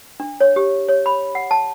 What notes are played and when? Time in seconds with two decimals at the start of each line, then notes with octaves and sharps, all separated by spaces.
0.20 D4
0.40 C#5
0.56 G4
0.89 C#5
1.06 B5
1.35 F#5
1.51 A5